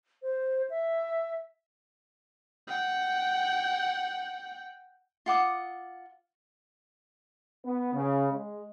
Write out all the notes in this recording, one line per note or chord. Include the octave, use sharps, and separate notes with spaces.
C5
E5
F#5 G5
F4 F#5 D6 D#6
B3
C#3
G#3